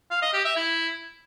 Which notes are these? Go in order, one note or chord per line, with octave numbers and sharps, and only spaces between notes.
F5
D#5
G4
E5
E4